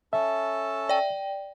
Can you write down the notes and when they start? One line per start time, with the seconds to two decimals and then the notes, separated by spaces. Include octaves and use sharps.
0.13 C#4 A4 E5 A5
0.89 D5 G5